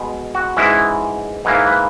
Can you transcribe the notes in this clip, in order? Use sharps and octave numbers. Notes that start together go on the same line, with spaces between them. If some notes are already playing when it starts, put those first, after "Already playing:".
Already playing: B2 G#3
F#4
G#2 E3 G#3 C#4 E4
G#2 E3 A#3
B4